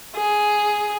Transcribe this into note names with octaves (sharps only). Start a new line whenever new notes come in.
G#4